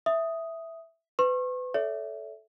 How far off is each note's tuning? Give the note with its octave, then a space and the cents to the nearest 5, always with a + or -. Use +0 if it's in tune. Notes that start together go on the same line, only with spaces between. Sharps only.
E5 +0 D#6 +0
B4 +30 C#6 -40
A4 -10 C#5 +45 E5 +0